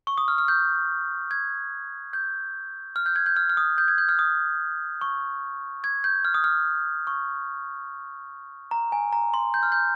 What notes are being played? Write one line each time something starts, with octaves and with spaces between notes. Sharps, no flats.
C#6
D#6
F6
F6
G6
G#6
G6
F6
G6
G#6
G6
F6
F6
D#6
G6
G#6
G6
F6
D#6
C#6
G#6
G6
F6
D#6
F6
C#6
A#5
G#5
A#5
C6
G6
F6
G6